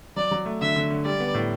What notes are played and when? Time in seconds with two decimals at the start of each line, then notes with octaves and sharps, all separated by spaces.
0.16 F#3 D5
0.31 F#3
0.46 A3
0.61 D3 E5
0.76 D3
0.90 D3
1.05 G3 D5
1.20 B3
1.34 A2